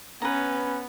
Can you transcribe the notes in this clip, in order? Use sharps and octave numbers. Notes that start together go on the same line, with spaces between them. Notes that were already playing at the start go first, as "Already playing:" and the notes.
B3 C#4 B4 A#5